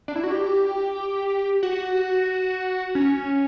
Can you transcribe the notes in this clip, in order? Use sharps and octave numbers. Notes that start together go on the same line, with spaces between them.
D4
E4
F#4
G4
F#4
C#4